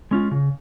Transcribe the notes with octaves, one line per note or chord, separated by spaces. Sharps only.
G#3 C#4 F4
C#3